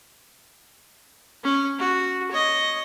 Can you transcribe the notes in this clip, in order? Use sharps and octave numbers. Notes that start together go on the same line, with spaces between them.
C#4
F#4
C#5 D#5